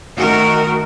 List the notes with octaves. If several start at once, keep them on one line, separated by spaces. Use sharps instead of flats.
D#3 A3 F#4 A#4